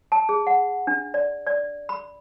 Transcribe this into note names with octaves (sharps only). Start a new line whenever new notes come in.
A5
G#4
F#5
D4
D5
D5
B5